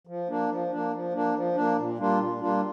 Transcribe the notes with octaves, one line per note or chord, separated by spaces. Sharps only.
F3
A#3 D4
F3
A#3 D4
F3
A#3 D4
F3
A#3 D4
A#2
G3 A#3 D4 F4
A#2
G3 A#3 D4 F4